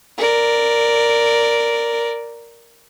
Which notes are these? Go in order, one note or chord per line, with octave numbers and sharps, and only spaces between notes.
A#4 D5